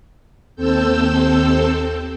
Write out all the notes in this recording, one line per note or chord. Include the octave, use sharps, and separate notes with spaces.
D#2 C4 A4 E6 G6